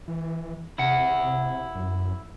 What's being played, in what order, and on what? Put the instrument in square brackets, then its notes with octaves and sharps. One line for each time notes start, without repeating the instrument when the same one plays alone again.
[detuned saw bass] E3
[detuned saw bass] C3 [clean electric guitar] E4 F#5
[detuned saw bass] F#2